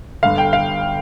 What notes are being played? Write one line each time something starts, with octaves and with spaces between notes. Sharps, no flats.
G1 G2 D3 F5
G5
F5